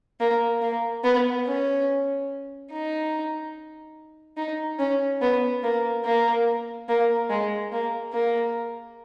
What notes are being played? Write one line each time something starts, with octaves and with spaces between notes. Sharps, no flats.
A#3
A#3
B3
C#4
D#4
D#4
C#4
B3
A#3
A#3
A#3
G#3
A#3
A#3